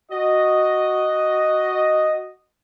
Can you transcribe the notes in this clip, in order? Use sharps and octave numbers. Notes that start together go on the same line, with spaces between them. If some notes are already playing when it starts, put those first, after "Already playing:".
F#4 D#5